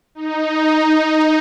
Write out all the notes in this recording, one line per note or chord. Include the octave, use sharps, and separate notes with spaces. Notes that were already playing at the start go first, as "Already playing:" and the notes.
D#4